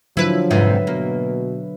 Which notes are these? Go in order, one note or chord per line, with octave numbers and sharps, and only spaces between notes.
D3 F3 F#3 E4 B4
F2 G#2 C3 B4 E5
B2 A#3